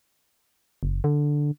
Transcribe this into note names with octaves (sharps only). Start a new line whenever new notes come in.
F#1
D3